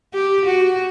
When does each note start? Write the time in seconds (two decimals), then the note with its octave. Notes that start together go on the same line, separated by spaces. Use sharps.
0.14 G4
0.46 F#4